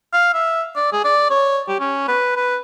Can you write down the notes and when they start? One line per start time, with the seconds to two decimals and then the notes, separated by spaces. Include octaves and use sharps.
0.13 F5
0.34 E5
0.76 D5
0.93 G#4
1.04 D5
1.30 C#5
1.68 G4
1.80 C#4
2.08 B4
2.36 B4